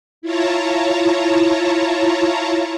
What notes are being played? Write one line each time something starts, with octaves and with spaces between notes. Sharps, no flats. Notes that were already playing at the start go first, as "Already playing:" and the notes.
E4 F4 C#5 A5 A#5